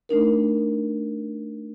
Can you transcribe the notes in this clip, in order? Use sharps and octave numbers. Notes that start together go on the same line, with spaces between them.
A3 D4 D#4 A#4